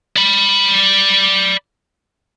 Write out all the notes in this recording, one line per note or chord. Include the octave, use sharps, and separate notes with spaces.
D5 B5